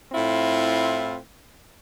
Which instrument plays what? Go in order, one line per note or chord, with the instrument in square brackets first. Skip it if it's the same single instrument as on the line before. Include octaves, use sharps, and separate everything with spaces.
[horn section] A2 C4 E4 F4